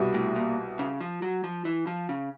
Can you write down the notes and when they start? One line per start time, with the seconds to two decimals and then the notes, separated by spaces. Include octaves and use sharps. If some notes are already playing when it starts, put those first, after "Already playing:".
Already playing: C2 B2 G3
0.14 A2
0.36 A#2
0.79 C#3
1.01 F3
1.22 F#3
1.44 F3
1.65 E3
1.87 F3
2.09 C#3